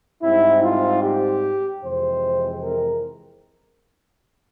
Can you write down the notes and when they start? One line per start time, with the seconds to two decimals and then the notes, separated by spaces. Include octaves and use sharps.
0.23 G#2 G3 C4 E4
0.63 F4
1.03 G4
1.83 F2 C3 E3 G#3 C4 C5
2.63 A#4